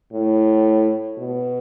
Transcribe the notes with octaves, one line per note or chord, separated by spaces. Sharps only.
A2
B2